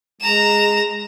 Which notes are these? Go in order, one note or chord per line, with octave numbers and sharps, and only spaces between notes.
G#3 A#5 E7